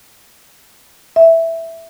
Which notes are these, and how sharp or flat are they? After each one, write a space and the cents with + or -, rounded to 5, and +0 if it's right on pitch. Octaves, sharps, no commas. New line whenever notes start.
E5 +0